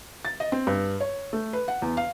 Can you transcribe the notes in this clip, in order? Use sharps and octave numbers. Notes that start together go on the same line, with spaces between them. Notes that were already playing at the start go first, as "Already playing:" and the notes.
A6
D#5
C4
G2
C#5
A3
B4
F#5
E2
F5